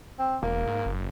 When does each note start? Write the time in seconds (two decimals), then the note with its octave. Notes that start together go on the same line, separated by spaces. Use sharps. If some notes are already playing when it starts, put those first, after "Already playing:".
0.19 C4
0.43 E1 A#3
0.67 G#2
0.86 F#1